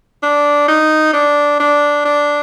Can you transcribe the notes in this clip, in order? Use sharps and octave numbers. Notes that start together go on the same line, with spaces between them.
D4
D#4
D4
D4
D4